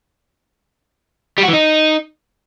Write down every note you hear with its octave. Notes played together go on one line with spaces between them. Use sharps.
G3
F#4
E3
D#4